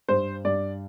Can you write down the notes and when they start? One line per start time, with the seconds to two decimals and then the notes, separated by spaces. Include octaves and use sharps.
0.09 G2 C5
0.44 G2 D5